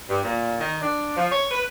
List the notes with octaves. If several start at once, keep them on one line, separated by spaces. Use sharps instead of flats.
G2
A#2
D#3
D4
F3
C#5
B4